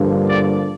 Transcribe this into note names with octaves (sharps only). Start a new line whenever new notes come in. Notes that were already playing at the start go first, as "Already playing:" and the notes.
Already playing: G2 D3 F3 A#3
D5